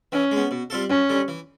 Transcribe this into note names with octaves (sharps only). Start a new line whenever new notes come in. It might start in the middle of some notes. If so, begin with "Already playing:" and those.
E3 C#4
G#3 B3
B2
G3 C4 F4 A4
F#2 C#4
D3 G3
E3